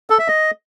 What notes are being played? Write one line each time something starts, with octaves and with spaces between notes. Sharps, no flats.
A4
E5
D#5